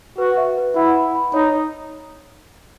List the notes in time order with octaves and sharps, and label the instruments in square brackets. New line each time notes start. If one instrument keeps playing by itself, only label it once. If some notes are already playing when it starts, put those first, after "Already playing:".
[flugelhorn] F#4 [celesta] B4
[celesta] E5
B4
[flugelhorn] E4 [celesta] F#5
[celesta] B5
B5
[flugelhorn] D#4 [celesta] C#5